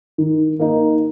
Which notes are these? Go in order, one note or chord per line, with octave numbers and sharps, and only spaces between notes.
D#3
A#3 D#4